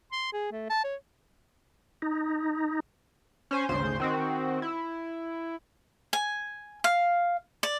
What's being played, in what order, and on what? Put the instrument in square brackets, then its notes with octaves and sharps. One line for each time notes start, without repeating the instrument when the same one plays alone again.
[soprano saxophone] C6
G#4
A3
A5
C#5
[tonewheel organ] D#4
[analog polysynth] C#4 C5 G#5
G#1 D2 C#3 C5 C6
D#3 C4 F#4
E4
[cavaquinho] G#5
F5
D5